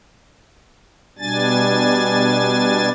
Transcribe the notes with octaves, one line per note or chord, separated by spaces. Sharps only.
B2 G3 D4 G#5 A6